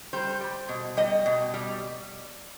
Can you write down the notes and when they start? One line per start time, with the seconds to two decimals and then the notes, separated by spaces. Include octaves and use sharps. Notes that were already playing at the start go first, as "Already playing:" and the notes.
0.13 G3 C5
0.41 G3
0.69 B2
0.97 G3 D#5
1.26 B2
1.54 G3